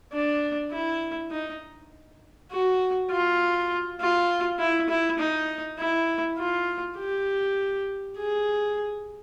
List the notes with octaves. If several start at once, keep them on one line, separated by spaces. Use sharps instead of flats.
D4
E4
D#4
F#4
F4
F4
E4
E4
D#4
E4
F4
G4
G#4